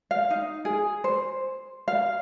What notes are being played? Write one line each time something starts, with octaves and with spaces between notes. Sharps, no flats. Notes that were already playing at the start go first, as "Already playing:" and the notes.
F5
D#4
G#4
C5
F5